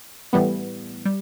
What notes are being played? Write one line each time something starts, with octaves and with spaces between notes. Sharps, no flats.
A2 E3 G3 B3
G3